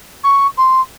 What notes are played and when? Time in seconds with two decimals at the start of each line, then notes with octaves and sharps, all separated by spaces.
0.23 C#6
0.57 C6